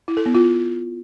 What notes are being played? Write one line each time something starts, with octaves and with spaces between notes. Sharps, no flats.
E4
A4
B3
F4